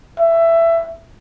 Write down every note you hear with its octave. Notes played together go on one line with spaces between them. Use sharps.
E5